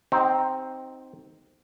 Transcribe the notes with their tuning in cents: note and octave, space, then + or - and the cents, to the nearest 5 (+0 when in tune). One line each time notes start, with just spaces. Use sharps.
C4 +0 D#4 +0 G4 -45